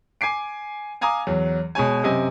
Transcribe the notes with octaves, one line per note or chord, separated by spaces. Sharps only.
G#5 D6 C7 D7
F5 G#5 A#5 D6 D#6
E2 F#3
B2 G#3 C#5 G#5
F#2 C3 C4 D#5 G#5